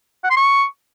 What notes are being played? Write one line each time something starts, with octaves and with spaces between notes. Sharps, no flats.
F#5
C6
C#6